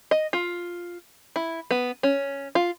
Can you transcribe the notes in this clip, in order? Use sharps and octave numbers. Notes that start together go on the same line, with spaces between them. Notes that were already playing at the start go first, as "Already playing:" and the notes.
D#5
F4
E4
B3
C#4
F4